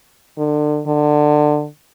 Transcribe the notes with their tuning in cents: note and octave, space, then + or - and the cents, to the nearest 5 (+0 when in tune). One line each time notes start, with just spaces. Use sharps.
D3 +30
D3 +20